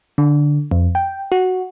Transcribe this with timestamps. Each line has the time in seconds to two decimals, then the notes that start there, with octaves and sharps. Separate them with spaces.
0.18 D3
0.71 F2
0.95 G5
1.32 F#4